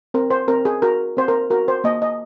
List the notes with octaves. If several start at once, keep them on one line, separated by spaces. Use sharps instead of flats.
C4 A#4
C5
C4 A#4
G#4
F#4 A#4
C4 C5
A#4
F#4 A#4
C5
A#3 D#5
D#5